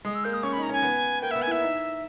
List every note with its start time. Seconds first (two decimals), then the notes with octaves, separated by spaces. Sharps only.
0.05 G#3 D#6
0.15 E6
0.24 A#3 G6
0.34 D#6
0.43 C#4 C#6
0.53 D#4 B5
0.63 A#5
0.69 C#4 G#5
0.82 B3
1.22 A#3 G5
1.31 B3 E5
1.42 G#5
1.47 E4 E5
1.61 D#4